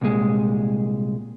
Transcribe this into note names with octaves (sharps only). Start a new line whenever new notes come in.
C2 A#2 G#3